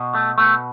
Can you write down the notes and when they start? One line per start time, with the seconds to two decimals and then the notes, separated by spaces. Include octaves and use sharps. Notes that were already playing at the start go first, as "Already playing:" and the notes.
Already playing: B2
0.14 A3
0.38 B2 A3